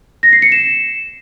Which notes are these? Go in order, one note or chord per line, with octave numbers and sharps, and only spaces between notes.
A#6
C7
C#7
E7